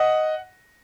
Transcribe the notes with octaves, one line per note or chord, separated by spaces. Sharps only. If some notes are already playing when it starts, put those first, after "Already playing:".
Already playing: D#5 F#5